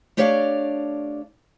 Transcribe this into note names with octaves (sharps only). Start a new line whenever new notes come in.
A3 D4 G4 C#5 D5 F5